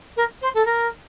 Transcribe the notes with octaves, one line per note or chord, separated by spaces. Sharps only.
A#4
C5
A4
A#4